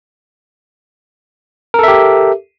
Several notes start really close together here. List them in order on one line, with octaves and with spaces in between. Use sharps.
A#4 A4 E5 G4